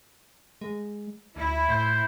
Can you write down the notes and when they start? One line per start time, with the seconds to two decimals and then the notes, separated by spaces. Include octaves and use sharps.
0.61 G#3
1.36 D2 E4
1.69 A2 C5